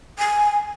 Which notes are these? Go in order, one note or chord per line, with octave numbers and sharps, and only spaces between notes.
G#5